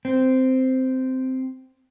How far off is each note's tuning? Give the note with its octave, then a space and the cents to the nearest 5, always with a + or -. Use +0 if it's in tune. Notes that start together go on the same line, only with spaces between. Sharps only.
C4 -10